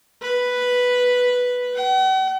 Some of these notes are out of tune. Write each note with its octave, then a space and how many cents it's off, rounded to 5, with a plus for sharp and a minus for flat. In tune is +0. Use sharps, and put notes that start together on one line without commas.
B4 +0
F#5 +45